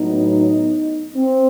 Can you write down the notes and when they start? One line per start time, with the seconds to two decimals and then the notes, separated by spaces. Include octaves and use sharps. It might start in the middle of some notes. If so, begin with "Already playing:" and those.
Already playing: A2 F#3 B3 D#4
0.31 D#4
1.16 C4